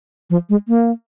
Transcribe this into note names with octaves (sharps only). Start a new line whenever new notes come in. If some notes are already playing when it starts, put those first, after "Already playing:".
F3
G#3
A#3